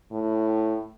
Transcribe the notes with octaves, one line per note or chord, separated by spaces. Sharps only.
A2